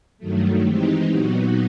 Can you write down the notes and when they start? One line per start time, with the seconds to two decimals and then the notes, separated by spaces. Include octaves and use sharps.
0.18 G2 D#3 F#3 A3
0.64 E3 G#3 C4 D#4 G4
1.09 A#2 F#3 B3 D#4 F#4